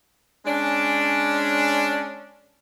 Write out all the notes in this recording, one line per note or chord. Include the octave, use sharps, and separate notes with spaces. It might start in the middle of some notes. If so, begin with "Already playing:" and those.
G#3 C#4 D4